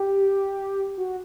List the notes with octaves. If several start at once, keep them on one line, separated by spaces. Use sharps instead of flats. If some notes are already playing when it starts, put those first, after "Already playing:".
Already playing: G4
F#4